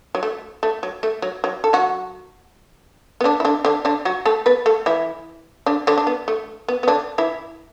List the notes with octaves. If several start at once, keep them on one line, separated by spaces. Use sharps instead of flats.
F#3
A3
A3
F#3
A3
F#3
F#3
A4
F#3 F#4
B3
D3 D4
E4
D3 D4
D3 D4
D3 D4
F#3 F#4
A3 A4
B3 B4
A3 A4
E3 E4
D3 D4
D3 D4
D4
B3
A3
B3
B3
D3 D4
E3 E4